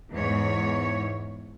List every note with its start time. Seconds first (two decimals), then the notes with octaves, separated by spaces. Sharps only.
0.12 E2 G#2 C#5